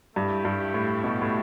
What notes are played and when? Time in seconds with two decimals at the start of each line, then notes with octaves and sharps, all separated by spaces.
0.16 G2 A3 E4 G4
0.45 G2
0.74 A2
1.04 B2
1.22 A2